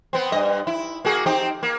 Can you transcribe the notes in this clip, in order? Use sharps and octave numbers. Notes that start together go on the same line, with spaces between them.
B3 C4
G2 D#5
E4
A#3 F#4 G#4
C4 D#4 G4
A#3